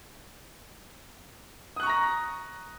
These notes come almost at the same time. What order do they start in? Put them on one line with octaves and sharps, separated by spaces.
D#6 F#6 C#6 A#5 A#6